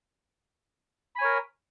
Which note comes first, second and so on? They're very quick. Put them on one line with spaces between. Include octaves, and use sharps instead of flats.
B5 G#5 C#5 A#4